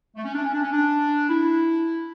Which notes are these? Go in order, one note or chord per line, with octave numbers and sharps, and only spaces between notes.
A3
C#4
D4
C#4
D4
C#4
D4
E4